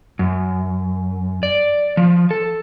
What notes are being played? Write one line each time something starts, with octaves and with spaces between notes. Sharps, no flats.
F#2
D5
F3
A4